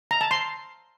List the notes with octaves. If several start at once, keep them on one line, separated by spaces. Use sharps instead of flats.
A#5
A5
C6